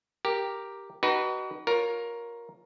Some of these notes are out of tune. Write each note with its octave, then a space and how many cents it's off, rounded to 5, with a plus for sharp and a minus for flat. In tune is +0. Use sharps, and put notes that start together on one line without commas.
G4 +0 A#4 +0
D#4 -20 F#4 +35 B4 -10
F4 +25 A#4 +10 C#5 +5